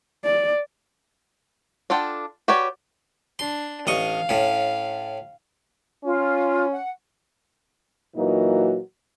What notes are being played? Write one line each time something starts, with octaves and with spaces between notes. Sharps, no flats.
D5
D4 F4 A4 F#5 G5
F#4 G4 B4 C#5 D5
D4 C6
A1 D#5 F5 C#6
A2 C#4
C#4 F4
F#5
A#2 E3 F#3 A#3 D#4 F#4